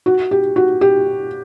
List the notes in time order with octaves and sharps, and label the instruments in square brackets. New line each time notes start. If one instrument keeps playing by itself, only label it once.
[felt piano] F#4
G4
F#4
G4